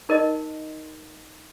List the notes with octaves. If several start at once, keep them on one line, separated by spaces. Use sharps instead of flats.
D#4 A#4 D#5